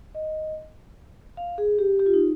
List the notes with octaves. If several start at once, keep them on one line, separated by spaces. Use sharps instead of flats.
D#5
F5
G#4
G4
G4
F4
D#4